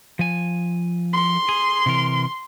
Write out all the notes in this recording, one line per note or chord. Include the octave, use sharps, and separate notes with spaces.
F3 G#5
C6
G#4
C3 E3 A#4